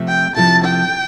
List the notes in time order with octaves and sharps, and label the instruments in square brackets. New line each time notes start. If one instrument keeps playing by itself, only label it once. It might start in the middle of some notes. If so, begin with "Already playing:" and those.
Already playing: [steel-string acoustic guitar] C3 F3 A3 A4
[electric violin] G5
[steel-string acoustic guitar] C3 F3 A3 E4 A4 [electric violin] A5
[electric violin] G5